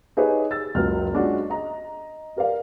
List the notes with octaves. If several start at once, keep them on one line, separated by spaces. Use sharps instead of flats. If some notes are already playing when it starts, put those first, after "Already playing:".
D#4 G4 G#4 B4 C#5
E6 A6
F#1 C#2 F#3 F6
G#3 C#4 D4 F4 F#4
D#5 A#5
G4 A#4 D5 F5